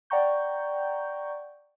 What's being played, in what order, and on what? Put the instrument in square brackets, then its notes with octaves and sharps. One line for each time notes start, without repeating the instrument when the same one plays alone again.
[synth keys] D5 F#5 G5 A#5 C#6 G6